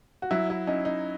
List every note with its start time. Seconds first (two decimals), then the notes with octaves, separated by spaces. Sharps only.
0.22 F#4
0.31 F#3 E4
0.50 E4
0.67 C#4 D#4
0.85 D#4